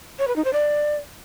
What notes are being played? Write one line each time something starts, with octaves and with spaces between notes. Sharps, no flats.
C#5
B4
D#4
C5
D5